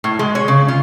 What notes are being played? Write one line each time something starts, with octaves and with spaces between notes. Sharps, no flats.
A2
G#3
C#5
C#3
F4